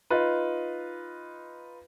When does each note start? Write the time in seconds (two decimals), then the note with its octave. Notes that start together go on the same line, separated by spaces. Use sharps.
0.10 D#4 F4 B4